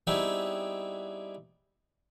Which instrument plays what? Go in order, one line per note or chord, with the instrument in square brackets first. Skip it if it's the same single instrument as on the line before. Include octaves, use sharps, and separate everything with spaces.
[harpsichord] G3 B3 C4 D#4 E4 G#4